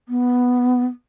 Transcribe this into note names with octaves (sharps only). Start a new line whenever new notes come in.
B3